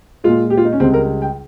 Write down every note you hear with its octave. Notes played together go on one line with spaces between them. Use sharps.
A#2 G#3 F4
G4
F4
D#4
C#4
C#2 C#3 G3 C4
A#4
G5